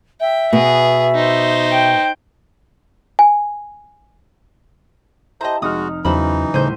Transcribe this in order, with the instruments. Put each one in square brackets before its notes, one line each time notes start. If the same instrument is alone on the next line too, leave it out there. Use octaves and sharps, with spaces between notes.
[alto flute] E5 [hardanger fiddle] G5
[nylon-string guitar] B2 B3 [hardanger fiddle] G#4
[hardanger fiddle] D#4 C5
[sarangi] G5
[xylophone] G#5
[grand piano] E4 G4 [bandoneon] C5 [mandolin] D#5 A5 A#5
[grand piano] F1 D#4 F6 [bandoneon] G#3 F#4 [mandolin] D#6
[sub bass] E2 [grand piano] C#3 F#3 [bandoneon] E3 D#4 [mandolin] C5 B5
[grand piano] D#1 A2 D#7 [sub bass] C#3 [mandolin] C5 C6 G6